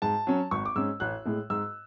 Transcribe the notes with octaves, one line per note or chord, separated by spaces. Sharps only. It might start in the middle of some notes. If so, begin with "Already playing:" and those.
G#2 A5
F#3 C#4
G#1 C#6
D6
G#2 G#3 C#4 E6
A1 F#6
A2 G#3
G#2 E6